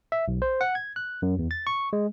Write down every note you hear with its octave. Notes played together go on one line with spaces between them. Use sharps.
E5
B1
C5
F#5
G#6
F#6
F#2
E2
A6
C#6
G#3